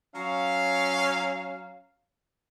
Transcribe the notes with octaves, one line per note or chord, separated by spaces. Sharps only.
F#3 C#4 F5